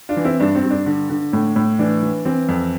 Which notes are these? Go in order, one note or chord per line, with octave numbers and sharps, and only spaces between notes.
D4 F4
E3
C4 E4
G2 D4
C4
G2
D4
D3
D3
A2
A2
E3 D4
E3
E3 C4
F2